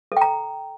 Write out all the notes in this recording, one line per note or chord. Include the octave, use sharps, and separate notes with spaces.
A4 G5 A#5